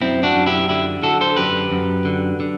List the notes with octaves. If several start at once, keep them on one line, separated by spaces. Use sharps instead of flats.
F#2 C4 E4
D4 F#4
F#2
E4 G4
D3 E4 G4
D3 F#4 A4
A4 C5
F#2 G4 B4
F#2
D3
D3